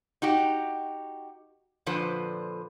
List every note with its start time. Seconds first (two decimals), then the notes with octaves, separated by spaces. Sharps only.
0.22 D#4 F#4 G4
1.86 A#2 D3 F3 B4 C5